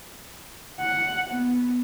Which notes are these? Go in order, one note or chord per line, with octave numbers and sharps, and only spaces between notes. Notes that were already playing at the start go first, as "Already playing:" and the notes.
F#5
B3